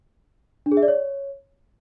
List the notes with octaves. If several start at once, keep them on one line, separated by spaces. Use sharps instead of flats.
D4
G#4
E5
D5
C#5